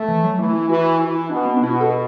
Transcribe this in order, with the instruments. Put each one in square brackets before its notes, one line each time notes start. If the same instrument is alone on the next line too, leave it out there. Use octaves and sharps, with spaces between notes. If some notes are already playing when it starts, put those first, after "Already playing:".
Already playing: [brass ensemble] A3
[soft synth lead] E3
F#3
[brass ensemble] E3 [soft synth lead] A3
[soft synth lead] E4
[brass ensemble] E3 [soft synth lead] F#4
[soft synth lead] F#4
[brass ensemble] E3 [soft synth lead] F#4
[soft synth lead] E4
[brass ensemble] B2 [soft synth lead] D4
[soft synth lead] B3
D4
[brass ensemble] B2 [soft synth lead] E4
[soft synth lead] F#4
A4
F#4